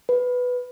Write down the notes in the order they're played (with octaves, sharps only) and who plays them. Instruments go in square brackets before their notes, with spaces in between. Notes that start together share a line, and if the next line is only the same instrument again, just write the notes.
[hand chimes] B4